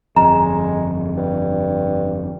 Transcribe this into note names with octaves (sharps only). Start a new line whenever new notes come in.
G1 F2 G#3 A#5
G2